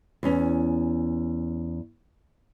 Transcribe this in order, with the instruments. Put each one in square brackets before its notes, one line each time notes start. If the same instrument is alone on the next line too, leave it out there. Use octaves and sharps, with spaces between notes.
[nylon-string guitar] E2 C#4